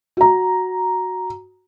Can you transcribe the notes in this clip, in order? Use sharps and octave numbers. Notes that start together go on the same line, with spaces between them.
F#4 A#5